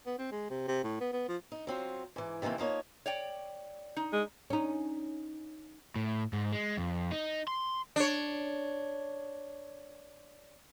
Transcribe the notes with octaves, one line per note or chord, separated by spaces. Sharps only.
B3
C4
G#3
C3
C3
A2
B3
B3
F3
D#4
F#3 C4 F4
G#2 E3
C3 D#3 E3 A#3 C4
F3 A#3 D#4 C#5
C#5 D5 G5
D#4
G#3
C#4 D#4
A2
G#2
G#3
F2
D#4
C6
D4 C#5